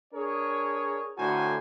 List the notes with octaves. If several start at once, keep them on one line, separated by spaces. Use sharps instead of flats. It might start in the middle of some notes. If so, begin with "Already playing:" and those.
D4 G#4 A#4 C#5
A2 D3 F#4 A#4 C5 G#5